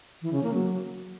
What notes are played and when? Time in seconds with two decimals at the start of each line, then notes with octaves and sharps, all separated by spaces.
0.22 E3
0.33 C#3
0.43 A#3
0.54 F#3